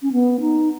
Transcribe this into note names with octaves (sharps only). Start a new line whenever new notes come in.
C#4
B3
D#4